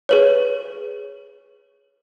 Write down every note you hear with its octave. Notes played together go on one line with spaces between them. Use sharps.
G#4 B4 C#5